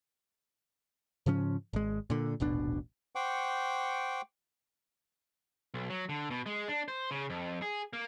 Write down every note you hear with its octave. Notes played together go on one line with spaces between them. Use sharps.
G#2 C#3 F3 C#4
G#1 G#3
A#2 D3
D#1 A1 B2 D4
C5 F#5 G5 C#6 D6
B1
F#3
D3
B2
G#3
D4
C5
C#3
F2
G#4
A#3